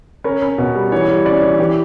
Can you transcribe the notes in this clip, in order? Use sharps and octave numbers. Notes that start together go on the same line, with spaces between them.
C#4 A#4
C#4
B2
G3
E3 C#5
G3
C#4 D5
E3
E3 G4